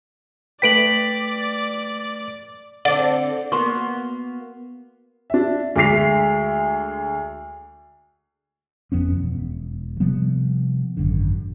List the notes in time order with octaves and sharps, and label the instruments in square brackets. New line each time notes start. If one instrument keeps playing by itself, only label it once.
[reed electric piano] A3 B4 G5 [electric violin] D5 [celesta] B6 D7 F#7
[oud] D3 C4 D4 [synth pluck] D5 [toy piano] F#5
[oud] A#3 B3 F#4 [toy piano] C6 C#6
[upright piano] D4 E5
D2 G#3 D6 B6 C7 F7
[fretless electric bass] F#1 F2 B3 C#4
E1 E2
C3 F3 G3 B3
G#1 F#2 D3